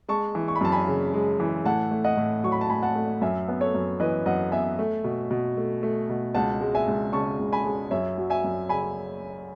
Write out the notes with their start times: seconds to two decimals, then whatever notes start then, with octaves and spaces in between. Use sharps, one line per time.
0.08 G#3 A5 C#6
0.35 E3
0.48 C#6
0.56 B5
0.61 F#2 A5
0.72 G#5 B5
0.87 C#3
1.14 G#3
1.40 E3
1.65 A2 F#5 A5
1.91 A3
2.04 D#5 F#5
2.17 A2
2.44 F#3 C#6
2.52 B5
2.61 A5
2.70 A2 G#5 B5
2.83 F#5 A5
2.95 A3
3.21 F#2 E5 G#5
3.48 B3
3.60 A4 C#5
3.75 F#2
4.00 E3 B4 D#5
4.26 F#2 D#5 F#5
4.52 B3 E5 G#5
4.79 A3
5.04 B2
5.31 B2
5.57 A3
5.83 A3
6.09 B2
6.35 C#2 F#5 A5
6.61 G#3
6.75 E5 G#5
6.87 C#2
7.13 C#3 A5 C#6
7.39 C#2
7.53 G#5 B5
7.65 G#3
7.91 F#2 C#5 E5
8.18 F#3
8.30 E5 G#5
8.44 F#2
8.69 C#3 G#5 B5